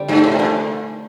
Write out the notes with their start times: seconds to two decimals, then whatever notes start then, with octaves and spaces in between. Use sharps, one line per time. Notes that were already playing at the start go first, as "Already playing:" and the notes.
Already playing: D3 G3 C4 G4
0.08 G2 A3
0.24 A2 C5
0.32 C3
0.39 A#2 D4